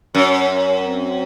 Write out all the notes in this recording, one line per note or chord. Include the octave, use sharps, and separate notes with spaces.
F#2 C#4
C#4
C4